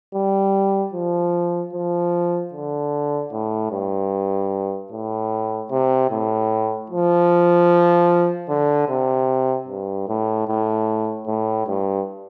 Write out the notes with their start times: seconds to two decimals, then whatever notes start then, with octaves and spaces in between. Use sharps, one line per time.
0.14 G3
0.93 F3
1.73 F3
2.53 D3
3.32 A2
3.71 G2
4.91 A2
5.71 C3
6.11 A2
6.90 F3
8.49 D3
8.88 C3
9.68 G2
10.08 A2
10.48 A2
11.27 A2
11.67 G2